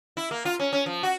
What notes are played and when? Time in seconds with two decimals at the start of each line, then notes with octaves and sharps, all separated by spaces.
0.17 E4
0.31 A#3
0.45 F4
0.60 C#4
0.73 C#4
0.86 F3
1.03 F#4